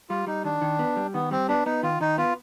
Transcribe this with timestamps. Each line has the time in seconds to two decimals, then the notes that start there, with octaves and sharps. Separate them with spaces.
0.10 G3 F4
0.27 G3 D#4
0.44 D#3 D4
0.62 D#3
0.79 B3
0.97 G3
1.14 D#3 B3
1.31 G3 C4
1.48 B3 D4
1.66 B3 D#4
1.83 D#3 F4
2.01 D#3 D#4
2.18 B3 F4